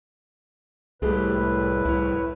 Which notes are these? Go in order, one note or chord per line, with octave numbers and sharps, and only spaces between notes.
C2 A2 G#3 A3 G4 B4
C2 E4 C#5